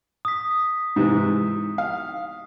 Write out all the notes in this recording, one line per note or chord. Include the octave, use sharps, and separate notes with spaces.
D#6 B6
G#2 C3 E3
F5